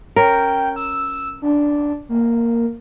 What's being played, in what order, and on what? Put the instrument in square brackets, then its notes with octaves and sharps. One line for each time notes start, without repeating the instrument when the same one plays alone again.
[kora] C#4 A#4 [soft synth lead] G5
[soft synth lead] E6
D4
A#3